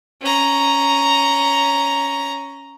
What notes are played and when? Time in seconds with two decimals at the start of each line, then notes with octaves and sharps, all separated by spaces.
0.22 C#4 A#5